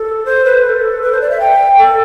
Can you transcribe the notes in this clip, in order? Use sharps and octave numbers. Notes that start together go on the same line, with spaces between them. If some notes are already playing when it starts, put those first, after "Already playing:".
Already playing: A4
C5
B4
B4
A4
B4
C5
D5
E5
G5
A4